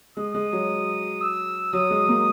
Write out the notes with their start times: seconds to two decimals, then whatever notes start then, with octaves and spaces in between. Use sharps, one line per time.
0.17 G#3 D#6
0.34 G#3
0.53 F#3
1.21 E6
1.73 F#3 D#6
1.90 G#3
2.08 A#3